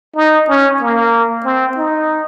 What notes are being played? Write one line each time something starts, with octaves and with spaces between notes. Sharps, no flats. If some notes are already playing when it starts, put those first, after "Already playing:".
D#4
C#4
A#3
C4
D#4